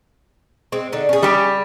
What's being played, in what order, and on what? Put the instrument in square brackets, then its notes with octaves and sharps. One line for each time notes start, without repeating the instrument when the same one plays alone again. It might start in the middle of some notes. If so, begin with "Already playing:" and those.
[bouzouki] G#3 C4
D3 D#4
C#4 G#4
[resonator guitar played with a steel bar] G3 G4